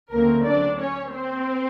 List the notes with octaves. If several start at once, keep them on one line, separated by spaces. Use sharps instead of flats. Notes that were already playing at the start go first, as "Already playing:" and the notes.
D2 C#3 F#3 A3 A#3 C4 A#4
D4 D5
C#4 C#5
C4 C5